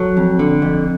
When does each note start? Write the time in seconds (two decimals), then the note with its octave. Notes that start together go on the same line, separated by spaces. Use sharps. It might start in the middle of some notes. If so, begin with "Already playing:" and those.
Already playing: F#3 A4
0.17 F2
0.39 D3
0.62 F2